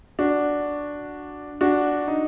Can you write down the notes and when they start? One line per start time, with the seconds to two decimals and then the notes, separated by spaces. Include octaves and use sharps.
0.19 D4 F#4
1.61 D4 F#4
2.08 D#4